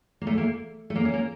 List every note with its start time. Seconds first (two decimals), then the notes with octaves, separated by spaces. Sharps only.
0.21 A#3
0.27 A3
0.38 A#3
0.90 A3
0.95 A#3
1.05 C#4
1.14 A#3